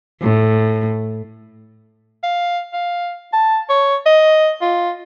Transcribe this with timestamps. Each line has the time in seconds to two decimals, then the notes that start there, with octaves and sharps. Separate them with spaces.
0.22 A2
2.23 F5
2.73 F5
3.33 A5
3.69 C#5
4.06 D#5
4.61 F4